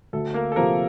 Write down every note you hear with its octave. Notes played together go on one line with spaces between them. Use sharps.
D2 A4
A#3 A#4
A4
C3 F3 A#3 A#4